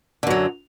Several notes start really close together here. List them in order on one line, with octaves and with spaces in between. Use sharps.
D3 F#2 F#3